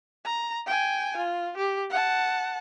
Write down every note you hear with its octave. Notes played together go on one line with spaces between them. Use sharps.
A#5
G5 G#5
F4
G4
F#5 A5